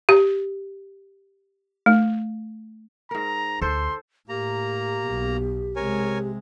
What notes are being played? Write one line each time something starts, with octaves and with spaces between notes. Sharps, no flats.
G4
A3
G#2 A#4 A#5
D2 A4 C5 C6
A2 A#3 G4 A#5
B1 B2
C3 G#3 A#4 C#5 G#5